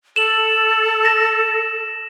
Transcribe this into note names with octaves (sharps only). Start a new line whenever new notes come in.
A4 E7 F#7
A#6 E7